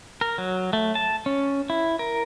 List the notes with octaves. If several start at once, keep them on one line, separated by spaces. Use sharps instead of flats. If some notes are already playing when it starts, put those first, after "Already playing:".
A#4
F#3
A3
A5
C#4
E4
A#4